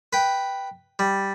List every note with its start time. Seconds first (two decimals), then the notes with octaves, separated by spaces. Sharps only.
0.13 B4 G5
0.99 G3